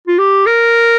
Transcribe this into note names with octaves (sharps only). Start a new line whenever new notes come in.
F4
G4
A#4